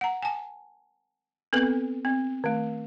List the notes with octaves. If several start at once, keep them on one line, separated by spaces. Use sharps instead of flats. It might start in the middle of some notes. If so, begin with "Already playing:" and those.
F#5 A#5
G#5 A5
B3 C4 A4 B4
C4
D#3 A3